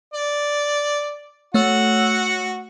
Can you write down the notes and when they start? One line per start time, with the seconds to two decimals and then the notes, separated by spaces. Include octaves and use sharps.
0.14 D5
1.54 A3 F#4 C#5 F#5 E6